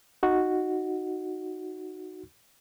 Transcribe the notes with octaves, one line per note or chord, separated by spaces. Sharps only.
D#4 F#4